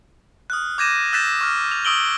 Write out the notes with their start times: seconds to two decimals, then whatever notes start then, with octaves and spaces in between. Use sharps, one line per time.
0.50 D#6 F6 F#6
0.78 D6 G6 G#6 A#6 D#7 E7
1.13 E6 F#6 G6 A6 B6 E7
1.41 C#6 F6
1.72 F7
1.85 C#6 D#6 E6 D7 F#7 G7